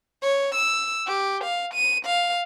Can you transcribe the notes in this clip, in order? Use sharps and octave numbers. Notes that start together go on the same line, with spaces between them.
C#5
E6
G4
F5
D#7
F5